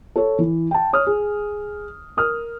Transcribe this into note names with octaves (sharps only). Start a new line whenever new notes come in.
A4 C#5
E3
G5 A5
C#5 D#6 F6
G#4
A#4 D#6 F6